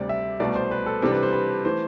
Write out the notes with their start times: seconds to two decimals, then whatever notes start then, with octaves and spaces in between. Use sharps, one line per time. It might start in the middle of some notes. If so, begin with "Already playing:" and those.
Already playing: D2 C3 G3 D5
0.09 E5
0.40 C2 B2 A3 D5
0.56 C5
0.71 B4
0.86 A4
1.02 C3 E3 G3 D4 A4
1.12 B4
1.23 C5
1.33 B4
1.65 E3 A3 C5